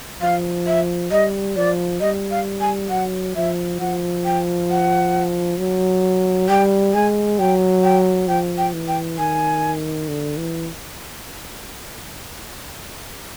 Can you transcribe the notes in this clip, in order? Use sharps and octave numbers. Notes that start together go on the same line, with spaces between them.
F3 F5
E5
G3 D#5
F3 D5
G3 D#5
F5
G#5
F#3 F#5
F3 E5
F3 F#5
G5
F#5
F#3
G3 G5
G#3 G#5
F#3 G5
G5
F3 G5
G5
E3
G5
D#3 G#5
D3
E3